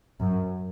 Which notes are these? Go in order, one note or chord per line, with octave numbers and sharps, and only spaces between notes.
F#2